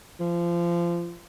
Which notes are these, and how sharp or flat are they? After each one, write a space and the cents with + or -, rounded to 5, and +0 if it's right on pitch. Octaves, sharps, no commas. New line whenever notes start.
F3 -25